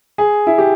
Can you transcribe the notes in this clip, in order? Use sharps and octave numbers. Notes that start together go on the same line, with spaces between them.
G#4
E4
G4